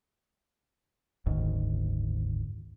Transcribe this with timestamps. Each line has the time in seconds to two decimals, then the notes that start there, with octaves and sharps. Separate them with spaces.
1.26 F#1 D2 G#2 D#3